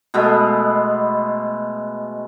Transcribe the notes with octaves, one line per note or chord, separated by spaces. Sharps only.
B2 G#3 A3 B3